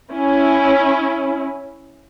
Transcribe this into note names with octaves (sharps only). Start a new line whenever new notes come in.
C#4 E4